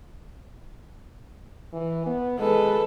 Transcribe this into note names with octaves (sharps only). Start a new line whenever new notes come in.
E3
B3
G#3 A4 B4